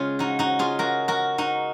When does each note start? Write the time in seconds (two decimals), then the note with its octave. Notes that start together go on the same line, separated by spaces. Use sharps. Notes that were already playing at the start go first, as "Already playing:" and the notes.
Already playing: C#3 G#3 C#4 F4 G#4
0.19 D#4 F#4
0.39 D#4 F#4
0.59 F4 G#4
0.79 F#4 A#4
1.08 F#4 A#4
1.38 D#4 F#4